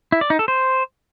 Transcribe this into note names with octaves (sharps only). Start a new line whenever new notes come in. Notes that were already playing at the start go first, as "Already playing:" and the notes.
E4
D5
D#4
A4
C5